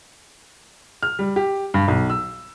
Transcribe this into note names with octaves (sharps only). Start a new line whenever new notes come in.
F6
G3
G4
G2
B1
E6